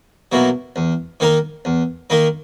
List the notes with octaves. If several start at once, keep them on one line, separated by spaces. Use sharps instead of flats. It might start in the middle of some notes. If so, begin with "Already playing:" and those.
B2 F#3 A#3 E4
E2
D#3 A#3 D#4 A#4
E2
D#3 A#3 D#4 A#4